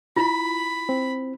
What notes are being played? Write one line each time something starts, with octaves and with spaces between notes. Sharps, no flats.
E4 F4 B5
C4